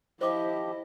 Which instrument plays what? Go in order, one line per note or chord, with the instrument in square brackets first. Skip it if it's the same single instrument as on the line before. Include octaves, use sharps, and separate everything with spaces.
[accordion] F3 G4 [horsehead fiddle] E4 [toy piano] C5 D6 [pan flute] D#5